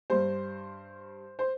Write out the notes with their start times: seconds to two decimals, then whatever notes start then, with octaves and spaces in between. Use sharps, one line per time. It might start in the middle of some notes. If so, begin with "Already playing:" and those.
0.10 G2 G3 C5
1.39 C5